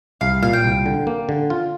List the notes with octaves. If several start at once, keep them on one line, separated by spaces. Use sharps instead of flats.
C2 F5
A#2 F5
G5
C2
D3
A#3
D3
F4